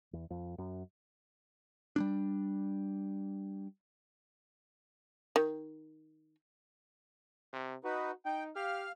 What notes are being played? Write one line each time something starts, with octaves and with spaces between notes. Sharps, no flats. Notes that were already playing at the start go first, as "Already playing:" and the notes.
E2
F2
F#2
G3 A#3 D4
D#3
C3
D#4 F#4 B4
D#4 G5
G4 F5 F6